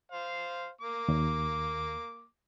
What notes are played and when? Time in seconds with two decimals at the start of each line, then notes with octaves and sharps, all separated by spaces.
0.12 C5 F5
0.81 A#3 D6
1.08 D#2